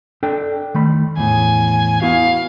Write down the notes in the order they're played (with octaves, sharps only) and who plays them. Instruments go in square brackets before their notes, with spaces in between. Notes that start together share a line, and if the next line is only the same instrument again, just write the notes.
[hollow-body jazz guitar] D4 A4 G5
D#3 A3 B5
[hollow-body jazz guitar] E2 A2 [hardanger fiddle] G#5
[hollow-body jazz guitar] B3 E4 F#4 [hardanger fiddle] F5